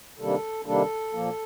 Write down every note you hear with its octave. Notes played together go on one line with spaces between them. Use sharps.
C3 D#3 G3 A#3 D4 A4
C3 D#3 G3 A#3 D4 A4
A#2 F3 A#3